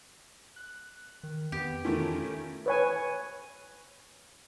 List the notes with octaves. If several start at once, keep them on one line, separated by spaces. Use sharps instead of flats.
F#6
D#3
F2 B3 G4
D#3 A3 C#4 E4 F4 G#5
B4 C#5 G#5